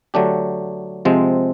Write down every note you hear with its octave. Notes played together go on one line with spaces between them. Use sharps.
D3 F#3 A3 D4 G4
C3 F3 G#3 C4